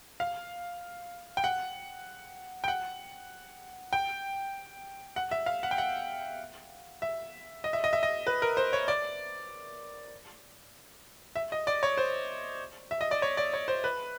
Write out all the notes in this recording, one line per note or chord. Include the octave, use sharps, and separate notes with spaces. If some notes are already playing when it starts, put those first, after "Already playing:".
F5
G5
F#5
G5
F#5
G5
F#5
E5
F5
F#5
G5
F#5
E5
D#5
E5
D#5
E5
D#5
B4
A#4
C5
C#5
D5
E5
D#5
D5
C#5
C5
E5
D#5
D5
C#5
D5
C#5
C5
B4